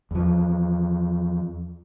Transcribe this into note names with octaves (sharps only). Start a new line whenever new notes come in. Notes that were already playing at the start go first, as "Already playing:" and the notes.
E2 F3